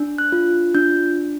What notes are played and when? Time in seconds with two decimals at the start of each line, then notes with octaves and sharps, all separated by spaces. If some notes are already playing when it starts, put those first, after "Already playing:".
Already playing: D4
0.18 F#6
0.32 F4
0.75 D4 G6